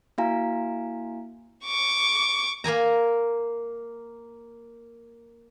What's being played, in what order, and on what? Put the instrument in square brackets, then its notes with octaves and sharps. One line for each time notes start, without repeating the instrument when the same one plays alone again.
[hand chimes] A#3 E4 F#4 F5 G#5 A#5
[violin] C#6 D6
[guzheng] A#3 A#4 G#5 A#5